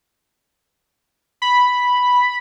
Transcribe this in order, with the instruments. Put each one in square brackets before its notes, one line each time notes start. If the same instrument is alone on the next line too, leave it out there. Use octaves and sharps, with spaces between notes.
[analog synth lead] B5